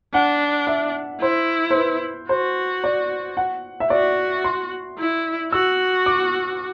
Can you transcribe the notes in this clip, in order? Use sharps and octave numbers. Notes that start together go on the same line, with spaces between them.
D4 F#5
E5
E4 C5
C5
B4
F#4 C5
D5
F#5
E5
F#4 D5
C6
E4
F#4 E6
D6